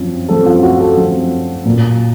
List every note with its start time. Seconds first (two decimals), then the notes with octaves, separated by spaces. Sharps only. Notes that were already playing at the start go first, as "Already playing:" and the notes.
Already playing: F#2 F3 C4
0.29 F#2 F3 C4 A4
0.46 F4
0.63 F#4
0.80 A4
0.97 F#2 F3 C4
1.65 A#2 F#3 A#3